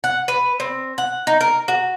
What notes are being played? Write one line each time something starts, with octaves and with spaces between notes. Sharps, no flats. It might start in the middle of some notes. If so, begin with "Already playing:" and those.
F#5
B4
C4
F#5
D#4
A#4
F#4